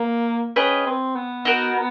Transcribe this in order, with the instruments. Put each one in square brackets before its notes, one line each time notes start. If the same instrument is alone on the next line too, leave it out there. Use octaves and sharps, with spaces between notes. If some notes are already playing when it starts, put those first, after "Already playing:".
Already playing: [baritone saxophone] A#3
[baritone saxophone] C#4 [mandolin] G#4 B4 D#5 G5
[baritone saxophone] C4
B3
[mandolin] D#4 F#4 A#4